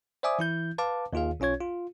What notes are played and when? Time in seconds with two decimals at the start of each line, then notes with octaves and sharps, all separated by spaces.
0.23 C5 D5 E5 G#5 D6 D#6
0.39 E3 E4 G6
0.78 B4 F5 A5 D6
1.13 D#2 D#3 F4 G#4 F5
1.40 B1 C#4 F4 C#5 G#6
1.60 F4